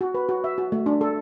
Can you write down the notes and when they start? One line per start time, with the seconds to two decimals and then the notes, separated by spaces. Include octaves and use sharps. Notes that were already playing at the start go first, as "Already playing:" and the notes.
0.01 F#4
0.15 B4
0.29 F#4
0.44 E5
0.58 F#4
0.72 A3
0.86 D4
1.01 A4